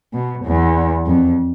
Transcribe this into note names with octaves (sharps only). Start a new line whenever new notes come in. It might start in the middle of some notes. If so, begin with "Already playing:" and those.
B2
E2
F2